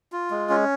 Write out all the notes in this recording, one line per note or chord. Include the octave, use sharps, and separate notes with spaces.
F4
G#3
C#4